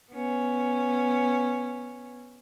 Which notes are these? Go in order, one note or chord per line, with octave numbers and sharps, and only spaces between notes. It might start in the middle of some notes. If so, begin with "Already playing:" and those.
B3 C#4